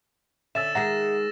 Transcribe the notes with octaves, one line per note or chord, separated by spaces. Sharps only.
D3 C#4 E5 E6 A6 E7
D#3 G#3 G#4 E5 F#5 A#5 A#6